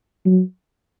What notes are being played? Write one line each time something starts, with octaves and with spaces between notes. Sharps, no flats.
F#3